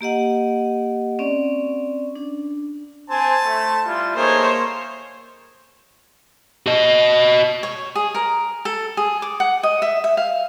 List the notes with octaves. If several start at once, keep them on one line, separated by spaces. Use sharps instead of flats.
A#3 G4 D#5 F#5
C4 C#4 D5
D4
C4 C5 G#5 A5
A3
G3 E4 F4
A3 A#3 D#4 G#4 C5 C#5
F#4 D#5
C#5
G#4
A#4
A4
G#4
D6
F#5
D#5
E5
E5
F5